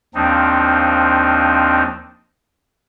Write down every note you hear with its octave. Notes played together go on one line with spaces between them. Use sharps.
D#2 F3 C4 D4 D#4